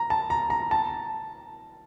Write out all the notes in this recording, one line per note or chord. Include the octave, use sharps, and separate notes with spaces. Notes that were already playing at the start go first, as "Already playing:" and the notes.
Already playing: A#5
A5
A#5
A#5
A5